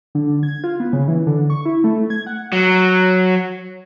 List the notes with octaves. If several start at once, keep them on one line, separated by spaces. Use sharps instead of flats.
D3
G#6
F4
B3
C#3
E3
D3
C#6
E4
A3
G#6
F#5
F#3